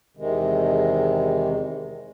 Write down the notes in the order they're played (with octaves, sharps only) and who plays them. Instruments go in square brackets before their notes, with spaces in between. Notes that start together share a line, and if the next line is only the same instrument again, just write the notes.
[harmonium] E2 C3 D#3 G#3